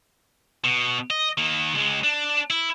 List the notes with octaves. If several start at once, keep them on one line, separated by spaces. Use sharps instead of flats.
B2
D#5
D#3 A#3
C#2 G#3
D4
E4